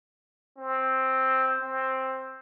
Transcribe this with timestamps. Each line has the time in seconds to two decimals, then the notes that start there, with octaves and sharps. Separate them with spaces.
0.58 C4
1.61 C4